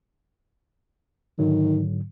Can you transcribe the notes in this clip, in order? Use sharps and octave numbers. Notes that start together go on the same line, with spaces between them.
G#2 D3 D#3 F#3